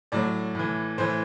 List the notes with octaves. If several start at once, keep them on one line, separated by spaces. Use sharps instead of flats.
A2 F#3 D5
A2 E3
A2 E3 C5